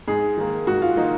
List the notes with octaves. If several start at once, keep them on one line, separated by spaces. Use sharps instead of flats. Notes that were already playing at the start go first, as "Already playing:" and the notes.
G#2 G#4
D#3 A#3
G#2 F#4
F4
D#3 A#3 D#4